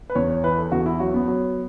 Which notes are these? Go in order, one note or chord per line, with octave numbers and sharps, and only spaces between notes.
B4
E2 C#5
C#5
E3 B4
A4
E2 F#4
E4
F#3 F#4
B3
F#3